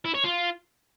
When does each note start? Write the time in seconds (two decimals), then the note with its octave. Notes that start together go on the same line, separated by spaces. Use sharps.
0.05 E4
0.14 C#5
0.24 F4